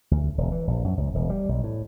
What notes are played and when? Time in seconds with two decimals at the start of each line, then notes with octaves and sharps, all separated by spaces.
0.11 D2
0.38 E1
0.52 E3
0.67 A#1
0.84 F#2
0.97 C#2
1.14 E1
1.30 G3
1.49 B1
1.64 A2